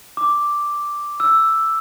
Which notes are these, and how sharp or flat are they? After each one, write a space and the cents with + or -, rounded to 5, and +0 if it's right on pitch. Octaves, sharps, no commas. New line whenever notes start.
D6 +0
E6 +5